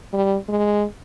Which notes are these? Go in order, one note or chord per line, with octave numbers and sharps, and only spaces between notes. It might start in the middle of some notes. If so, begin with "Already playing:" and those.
G3
G#3